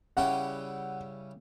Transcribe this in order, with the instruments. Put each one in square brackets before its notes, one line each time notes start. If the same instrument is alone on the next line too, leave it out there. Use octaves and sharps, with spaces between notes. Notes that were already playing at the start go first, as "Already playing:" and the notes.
[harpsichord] C#3 G3 C#4 E4 G4 [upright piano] F#5